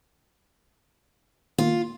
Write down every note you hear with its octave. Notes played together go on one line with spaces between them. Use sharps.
D#3 A#3 F4